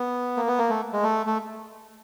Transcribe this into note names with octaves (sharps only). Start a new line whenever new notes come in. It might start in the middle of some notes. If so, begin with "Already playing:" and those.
Already playing: B3
A#3
B3
A#3
A3
G#3
A3
A3